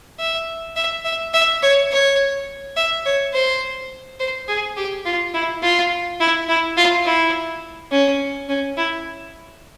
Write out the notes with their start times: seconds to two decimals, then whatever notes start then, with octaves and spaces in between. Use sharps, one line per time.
0.19 E5
0.76 E5
1.05 E5
1.34 E5
1.63 C#5
1.91 C#5
2.76 E5
3.05 C#5
3.34 C5
4.20 C5
4.48 G#4
4.77 G4
5.05 F4
5.34 E4
5.63 F4
6.20 E4
6.48 E4
6.77 F4
7.05 E4
7.92 C#4
8.49 C#4
8.77 E4